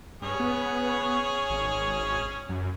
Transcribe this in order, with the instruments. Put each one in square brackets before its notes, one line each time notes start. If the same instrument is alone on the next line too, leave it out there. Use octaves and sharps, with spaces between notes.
[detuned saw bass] G2 [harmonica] C#4 G#4 C#5
[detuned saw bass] B3
G#1
F#2